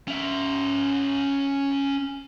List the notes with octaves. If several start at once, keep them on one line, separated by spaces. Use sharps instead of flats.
C#4 E5